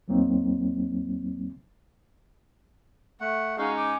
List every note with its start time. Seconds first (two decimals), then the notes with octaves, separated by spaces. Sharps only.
0.08 E2 A2 F#3 A#3 C4 D#4
3.20 A3 F#5
3.58 G#3 C#4 D#4 F#4 F5
3.77 D6